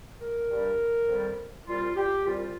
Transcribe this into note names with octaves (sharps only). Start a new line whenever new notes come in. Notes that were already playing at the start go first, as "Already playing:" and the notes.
A#4
G2 G3
F2 D#3 G3
C2 A#2 G3 F4
G4
C2 A#2 G3 F4